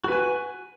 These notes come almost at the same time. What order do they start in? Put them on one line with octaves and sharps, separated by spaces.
F#4 B4 G#5